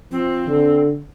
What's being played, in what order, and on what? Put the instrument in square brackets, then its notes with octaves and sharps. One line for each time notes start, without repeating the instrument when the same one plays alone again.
[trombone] F3 [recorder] C4
[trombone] D3